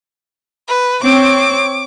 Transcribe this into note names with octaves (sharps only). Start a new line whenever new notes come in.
B4
C4 C#5 D6